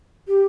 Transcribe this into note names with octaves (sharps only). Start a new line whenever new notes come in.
G4